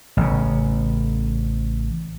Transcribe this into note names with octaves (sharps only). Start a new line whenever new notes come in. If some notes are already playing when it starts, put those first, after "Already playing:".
A1 C#3